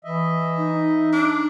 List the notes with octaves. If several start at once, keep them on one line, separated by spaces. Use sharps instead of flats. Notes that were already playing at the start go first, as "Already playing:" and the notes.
E3 D#5 E5
D#4
D4